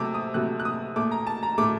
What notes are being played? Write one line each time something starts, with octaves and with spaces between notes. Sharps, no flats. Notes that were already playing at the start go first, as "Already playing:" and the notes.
Already playing: C3 F#3 A3 D6
D#6
C3 F#3 A3 F#6
F#6
D#6
A#2 A3 D6
A#5
A5
A#5
A#2 A3 D6